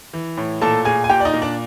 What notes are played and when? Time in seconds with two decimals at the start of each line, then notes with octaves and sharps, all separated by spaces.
0.13 E3
0.37 A2
0.61 A#2 A4 A5
0.85 A#2 G#4 G#5
1.04 G#5
1.09 A#2 G4 G5
1.20 D5
1.25 D#4 D#5
1.34 A#2
1.42 D4 D5